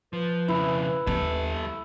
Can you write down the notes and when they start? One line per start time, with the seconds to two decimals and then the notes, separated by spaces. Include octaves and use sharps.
0.13 F3 B4
0.48 F2 C#3 E4
1.07 D#2 G3 D4 A4